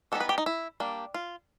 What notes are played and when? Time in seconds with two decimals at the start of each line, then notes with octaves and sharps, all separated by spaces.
0.12 E3 G3 B3 D#4 A4
0.20 B4
0.29 G4
0.38 D#4
0.46 E4
0.80 G3 A#3 D4
1.14 F4